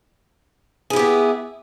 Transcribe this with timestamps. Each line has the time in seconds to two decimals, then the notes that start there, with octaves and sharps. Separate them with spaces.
0.90 G#4
0.93 E4
0.96 G4
0.99 B3